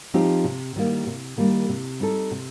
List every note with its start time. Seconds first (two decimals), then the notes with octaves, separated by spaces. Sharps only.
0.14 F3 C4 D#4 G4
0.44 C3
0.76 D#3 G3 A#3
1.07 C3
1.38 D#3 G3 A#3
1.69 C3
2.00 G3 C4 D#4 A4
2.31 C3